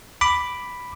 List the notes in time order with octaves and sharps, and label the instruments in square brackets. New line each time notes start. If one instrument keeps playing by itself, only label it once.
[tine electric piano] B5 D6